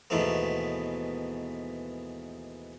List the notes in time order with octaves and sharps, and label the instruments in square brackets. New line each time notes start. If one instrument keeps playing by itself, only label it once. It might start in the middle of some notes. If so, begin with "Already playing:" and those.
[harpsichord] D#2 G#2 B2 E3 A3 B3